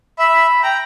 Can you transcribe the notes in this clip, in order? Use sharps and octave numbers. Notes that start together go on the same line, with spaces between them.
E5 B5
G5 A#5